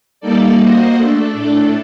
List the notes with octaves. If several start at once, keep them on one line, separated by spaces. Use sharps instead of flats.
G3 A#3 D#4 A4 D5
A#3 F#4 C5 D#5
A3 D4 A4
A2 A3 D4 A4